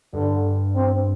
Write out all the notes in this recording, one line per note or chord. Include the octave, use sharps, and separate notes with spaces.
G2 D3
C4